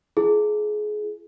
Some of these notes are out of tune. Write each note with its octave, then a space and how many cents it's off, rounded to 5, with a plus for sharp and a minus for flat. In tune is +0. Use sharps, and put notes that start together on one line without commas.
F4 -45 G#4 +25